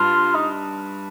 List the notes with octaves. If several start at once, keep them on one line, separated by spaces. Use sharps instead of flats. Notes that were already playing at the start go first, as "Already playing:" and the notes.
Already playing: G2 F4
D#4